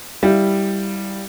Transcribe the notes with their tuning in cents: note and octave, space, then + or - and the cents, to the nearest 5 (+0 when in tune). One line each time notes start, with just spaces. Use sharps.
G3 +0 E4 -10 F5 +0